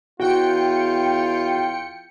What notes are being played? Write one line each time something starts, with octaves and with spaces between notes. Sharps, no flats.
E2 F4 F#4 F#5 G5 C#7